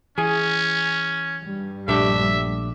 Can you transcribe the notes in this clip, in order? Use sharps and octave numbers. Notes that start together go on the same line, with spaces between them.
E3 C#4 G#4
G2 G3
A#1 A3 D4 G4 E5